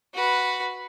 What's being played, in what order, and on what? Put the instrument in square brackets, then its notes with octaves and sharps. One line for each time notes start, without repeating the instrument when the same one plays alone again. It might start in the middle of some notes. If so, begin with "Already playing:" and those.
[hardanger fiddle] F#4 B4